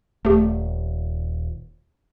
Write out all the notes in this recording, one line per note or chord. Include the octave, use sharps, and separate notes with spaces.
D#1 A3 G4